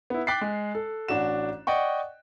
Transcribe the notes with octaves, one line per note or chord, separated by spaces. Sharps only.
B3 E4
G5 D6 F#6 A6 B6 C7
G#3
A4
A1 D4 F#4 E7
D5 D#5 F#5 G5 C#6